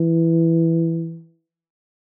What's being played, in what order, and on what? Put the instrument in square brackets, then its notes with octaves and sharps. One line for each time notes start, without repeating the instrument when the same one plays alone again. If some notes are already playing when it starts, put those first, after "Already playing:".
Already playing: [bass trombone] E3